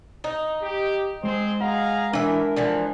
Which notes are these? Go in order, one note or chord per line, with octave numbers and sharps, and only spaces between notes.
D#4
G4
G#3 C4 G#4 C5
G#4 F5 F#5 A#5
E3 D4 A#4 E5
D3 E3 F3